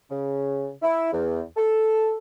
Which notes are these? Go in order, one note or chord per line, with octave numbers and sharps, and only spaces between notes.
C#3
E4
E2
A4